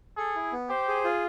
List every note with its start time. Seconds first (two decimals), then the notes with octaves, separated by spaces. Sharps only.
0.17 G#4 A4
0.35 E4
0.52 B3
0.69 G4 C5
0.88 G#4
1.04 F4